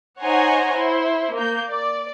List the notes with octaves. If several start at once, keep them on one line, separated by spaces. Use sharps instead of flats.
D#4 C5 C#5 F#5 G#5 A#5
E4 C5
A#3 G6
D5